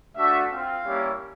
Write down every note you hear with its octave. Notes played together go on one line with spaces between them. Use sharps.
A3 D4 F#4 E5
C4 F4 F5
G3 A#3 C#4 E4 G4